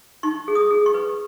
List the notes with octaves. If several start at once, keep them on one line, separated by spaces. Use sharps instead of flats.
D#4 C#6
G#4
D#6
G#4
C#6
B4